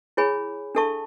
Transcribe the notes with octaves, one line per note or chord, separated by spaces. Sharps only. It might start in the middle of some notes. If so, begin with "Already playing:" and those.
E4 G#4 C#5 G#5 B5
D4 A4 E5 A5 C#6